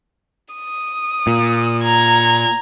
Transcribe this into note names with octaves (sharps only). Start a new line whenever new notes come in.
D#6
A#2
A#5 G#6